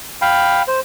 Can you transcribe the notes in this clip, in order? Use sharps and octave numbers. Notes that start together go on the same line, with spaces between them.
F5 G5 B5
C5